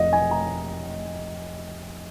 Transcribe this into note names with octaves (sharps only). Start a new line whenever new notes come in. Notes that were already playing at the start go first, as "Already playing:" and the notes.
Already playing: F1 D#5
G#5
A#5